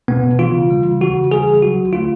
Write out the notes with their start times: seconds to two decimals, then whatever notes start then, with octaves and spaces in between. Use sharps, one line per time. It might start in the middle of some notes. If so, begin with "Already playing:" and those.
0.08 B2 B3
0.23 B2
0.39 E3 F4
0.55 C#3
0.70 G3
0.85 C#3
1.01 E3 F#4
1.16 C#3
1.31 G3 G#4
1.47 C#3
1.62 F#3 F#4
1.78 D3
1.93 A3 F4